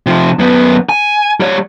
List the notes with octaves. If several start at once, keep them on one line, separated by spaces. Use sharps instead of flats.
C3 F3
F#2 B3
G#5
G3 C#5